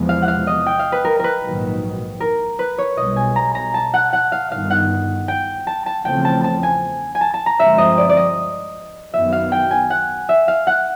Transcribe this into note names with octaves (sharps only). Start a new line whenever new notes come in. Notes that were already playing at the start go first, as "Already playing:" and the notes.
Already playing: E2 C3 F3 G#3
F5
F#5
F5
D#5
G5
F5
B4
A#4
A#4 B4
A#1 G#2 D#3 F#3
A#4
B4
C#5
B1 B2 G3 D#5
G#5
A#5
A#5
A5
F#5
F#5
F5
G1 G2 D#3 F5
F#5
G5
A5
A5
E2 C#3 F3 A3 C4 G5
A5
A5
G#5
G#5
A5
A5
A#5
G2 D3 F3 G#3 C4 E5
D#5
D5
D5
D#5
F#2 D#3 F#3 B3 E5
F5
G5
G#5
F#5
E5
F5
F#5